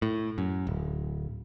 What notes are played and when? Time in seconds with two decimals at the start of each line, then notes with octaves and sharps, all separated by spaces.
0.02 A2
0.38 F#2
0.67 D1